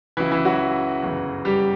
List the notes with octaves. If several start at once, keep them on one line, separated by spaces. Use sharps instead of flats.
C#2 C#3 E3 F#3 E4
E3 E4
F#3 F#4
G1 F#2 C#3 E3
G3 G4